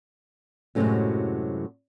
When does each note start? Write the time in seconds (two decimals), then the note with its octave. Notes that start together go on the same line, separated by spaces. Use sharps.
0.75 F#2 A2 C3 E3 F#3 G#3